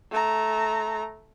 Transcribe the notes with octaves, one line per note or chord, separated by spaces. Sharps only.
A3 A#5